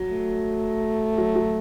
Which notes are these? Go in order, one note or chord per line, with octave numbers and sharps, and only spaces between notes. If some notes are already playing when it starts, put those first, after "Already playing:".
Already playing: F#3
A3
F#3
F#3